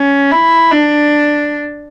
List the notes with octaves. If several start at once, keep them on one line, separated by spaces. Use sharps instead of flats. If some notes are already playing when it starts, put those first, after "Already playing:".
Already playing: C#4
E4
D4